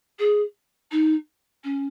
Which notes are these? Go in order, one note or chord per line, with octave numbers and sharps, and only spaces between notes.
G#4
D#4
C#4